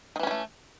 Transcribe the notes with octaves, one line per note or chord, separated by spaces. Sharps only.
D#3 E3 G3 A3 C#4